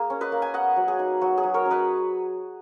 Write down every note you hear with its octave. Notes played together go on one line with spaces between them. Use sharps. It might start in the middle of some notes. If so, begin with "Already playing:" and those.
Already playing: A#3 G#4
C#4
B4 D#5
A#3
G#5
B3 D#5 F#5
F#3
G#4
D#4
F#3 F#4
G#4
F#3
A#4 C#5
C#4
B4 D#5